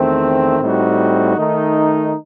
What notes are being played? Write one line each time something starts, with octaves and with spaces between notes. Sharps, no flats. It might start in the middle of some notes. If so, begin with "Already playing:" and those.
Already playing: E2 D#3 A3 C4
A2 G3 C4 D#4 F#4
D#3 A3 D#4